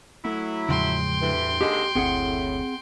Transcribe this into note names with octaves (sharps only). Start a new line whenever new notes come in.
F#3 A3 E4
E2 A2 C#3 F3 G#3 G5 C6
D2 G2 E3
D#2 D3 G#3 G4
F#1 D2 A2 C4 G#4 F#5